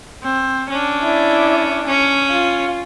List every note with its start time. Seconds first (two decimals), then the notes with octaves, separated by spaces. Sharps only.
0.23 C4
0.70 C#4 D4
1.02 E4 D5
1.87 C#4
2.32 F4